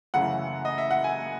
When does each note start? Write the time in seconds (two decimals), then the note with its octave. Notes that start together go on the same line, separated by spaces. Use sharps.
0.14 F#2 C#3 E3 A3 F#5
0.65 D#5
0.78 E5
0.91 F#5
1.04 G#5